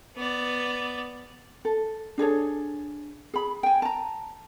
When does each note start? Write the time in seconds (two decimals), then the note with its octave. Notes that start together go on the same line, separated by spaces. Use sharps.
0.16 B3 D5
1.65 A4
2.18 D4 G#4 A4 C#5
3.34 G#4 B5
3.63 G5 G#5
3.82 A5 A#5